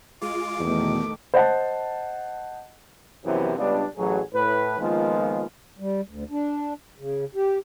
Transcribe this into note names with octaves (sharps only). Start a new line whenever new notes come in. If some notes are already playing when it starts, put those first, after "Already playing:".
G#3 F4 D6
E2 B2 D#3 A3
C5 D#5 F#5 A5
F#2 C3 E3 F3 B3 E4
C#2 G3 B3 D4
A1 F#3 G#4
A2 B4
D#3 F3 G#3 A#3 B3 F4
G3
D2
D4
C#3
G4